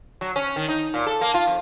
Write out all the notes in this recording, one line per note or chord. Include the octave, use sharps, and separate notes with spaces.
F#3
C#4
D#3
D#4
A#2
A4
A#3
F4
F2